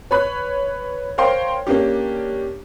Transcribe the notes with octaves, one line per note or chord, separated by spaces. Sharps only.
B4 C#5 B5 F#6
A#4 C5 C#5 F5 G5 C6
A#3 C#4 D4 G4